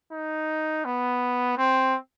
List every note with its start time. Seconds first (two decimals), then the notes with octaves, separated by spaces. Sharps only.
0.12 D#4
0.85 B3
1.58 C4